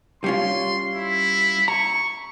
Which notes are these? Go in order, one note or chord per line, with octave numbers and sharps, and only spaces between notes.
G3 C#4 F4 C6
E4
A#5 C#6